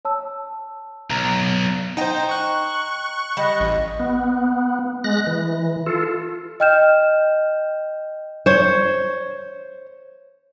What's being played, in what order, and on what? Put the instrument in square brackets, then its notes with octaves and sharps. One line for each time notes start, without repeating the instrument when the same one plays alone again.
[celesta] C#5 A5 E6
[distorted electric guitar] B1 [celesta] A#5
[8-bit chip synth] D#4 C5 [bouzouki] D#5 G5 A#5
[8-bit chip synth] C#6 F#6
[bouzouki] G3 [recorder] D#5
[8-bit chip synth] A1
[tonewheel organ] B3
G#3 F#6 A#6
E3
F4 A4
[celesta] D#5 G5 F6 G6 E7
[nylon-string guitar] C5 C#5